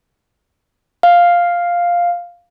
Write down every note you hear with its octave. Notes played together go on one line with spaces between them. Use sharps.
F5